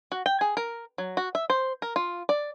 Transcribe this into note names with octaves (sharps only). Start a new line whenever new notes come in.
F#4
G5
G#4
A#4
F#3
F#4
E5
C5
A#4
F4
D5